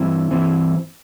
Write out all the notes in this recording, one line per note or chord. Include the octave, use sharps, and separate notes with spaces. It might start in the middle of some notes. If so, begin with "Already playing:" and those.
Already playing: G2 E3 C4 E4
G2 E3 C4 E4